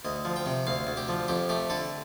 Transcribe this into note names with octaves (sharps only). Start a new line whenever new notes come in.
D2 D#5
F3
G5
C3
D2 F5
D2
G4
F3
F2 G4
A3 G4
D3 A4